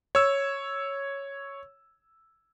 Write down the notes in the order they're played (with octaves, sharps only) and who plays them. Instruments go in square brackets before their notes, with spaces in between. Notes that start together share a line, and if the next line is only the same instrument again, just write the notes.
[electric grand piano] C#5 E6